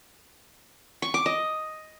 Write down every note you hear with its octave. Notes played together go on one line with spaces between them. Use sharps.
C#6
D6
D#5